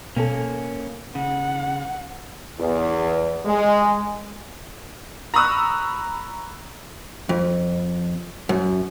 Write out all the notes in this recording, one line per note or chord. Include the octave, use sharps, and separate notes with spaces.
B2 A#3 C#4 A4
C#3 F#5
E2
G#3
A#5 B5 C#6 D#6 E6 F#6
F2
F#2